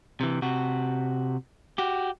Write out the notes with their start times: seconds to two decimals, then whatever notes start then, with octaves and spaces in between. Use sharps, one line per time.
0.21 C3 E3
0.42 C3 F#4
1.78 F#4 G4